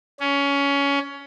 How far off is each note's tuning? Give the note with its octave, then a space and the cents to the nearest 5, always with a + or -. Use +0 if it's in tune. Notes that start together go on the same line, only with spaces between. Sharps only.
C#4 +20